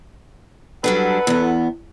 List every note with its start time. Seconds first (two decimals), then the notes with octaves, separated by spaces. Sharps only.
0.84 F#3 G3 D4 A4 B4 F#5
1.27 E2 B3